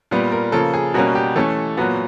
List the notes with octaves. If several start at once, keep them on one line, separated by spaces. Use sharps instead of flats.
A#2 G3 B3
A#4
C#3 F3 A#3 A4
G#4
B2 G3 A#3 C#4 F#4
G4
E3 A3 C#4 A4
A#2 F#3 B3 F#4